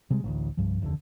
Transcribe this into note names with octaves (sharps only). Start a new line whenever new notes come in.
C3 G3 G#3
A1 D2
C2 G2 F3
F1 D#2 A2 D3